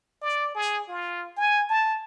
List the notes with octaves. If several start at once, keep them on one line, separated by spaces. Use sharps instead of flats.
D5
G#4
F4
G#5
A5